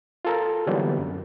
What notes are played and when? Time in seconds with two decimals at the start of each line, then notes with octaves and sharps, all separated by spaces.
0.25 F4 A4 A#4
0.67 D3 E3 F#3 G3 A#3 B3
0.98 F#2